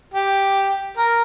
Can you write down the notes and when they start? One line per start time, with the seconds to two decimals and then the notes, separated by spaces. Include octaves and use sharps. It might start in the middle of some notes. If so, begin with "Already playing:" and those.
0.14 G4
0.97 A#4